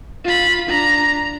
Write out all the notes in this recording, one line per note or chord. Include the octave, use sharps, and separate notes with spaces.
F4 B5
D4 A#5